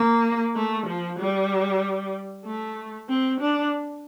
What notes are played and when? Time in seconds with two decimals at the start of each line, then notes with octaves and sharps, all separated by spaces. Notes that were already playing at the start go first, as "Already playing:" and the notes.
Already playing: A#3
0.56 A3
0.87 F3
1.19 G3
2.46 A3
3.09 C4
3.40 D4